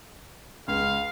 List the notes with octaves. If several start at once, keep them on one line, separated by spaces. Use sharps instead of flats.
C#2 F5